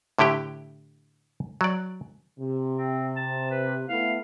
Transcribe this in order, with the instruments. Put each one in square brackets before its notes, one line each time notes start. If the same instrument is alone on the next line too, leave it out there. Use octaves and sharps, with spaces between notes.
[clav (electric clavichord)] A2 D3 E4 G4 G5
F#3 D5
[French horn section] C3
[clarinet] C4
A5
B4
[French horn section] A3 B3 E4 [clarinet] F5